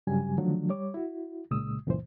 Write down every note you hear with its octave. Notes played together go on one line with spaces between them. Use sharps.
G2 C#3 F#3 G3 G4 G#5
D3 D#3 F3 F#3 A3 D4
G3 C#5 D6
E4 F#4
C2 A#2 C#3 G#3 D#6 E6
C#2 F#2 A#2 E3 C5